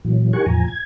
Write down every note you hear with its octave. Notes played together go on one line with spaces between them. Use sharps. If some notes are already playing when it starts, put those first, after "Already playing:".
A#2 E3 F#3
D#4 G4 A#4 F#5 G#5 C#6
E2 A2 F3 G#5 A#5
G#6